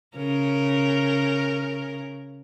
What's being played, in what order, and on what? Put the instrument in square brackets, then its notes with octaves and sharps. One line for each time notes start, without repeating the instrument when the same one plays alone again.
[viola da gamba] C#3 A#4